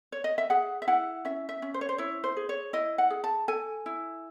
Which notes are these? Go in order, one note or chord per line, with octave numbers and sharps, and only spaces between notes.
C#5
D#5
E5
G#4 F#5
E5
E4 F#5
C#4 E5
E5
C#4
C5
C#5
C5
E4 C#5
C5
G#4
C#5
E4 D#5
F#5
G#4
A5
A4 G#5
E4